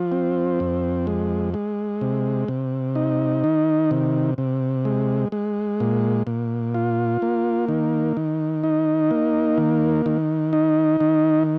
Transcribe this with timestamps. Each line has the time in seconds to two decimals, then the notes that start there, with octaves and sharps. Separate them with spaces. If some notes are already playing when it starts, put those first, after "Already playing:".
Already playing: F3
0.12 C4
0.60 F2
1.07 G#3
1.54 G#3
2.01 C3
2.48 C3
2.95 D#4
3.44 D#3
3.91 C3
4.38 C3
4.85 G#3
5.32 G#3
5.80 A#2
6.27 A#2
6.74 F4
7.22 A#3
7.68 D#3
8.17 D#3
8.64 D#4
9.11 A#3
9.58 D#3
10.06 D#3
10.53 D#4
11.00 D#3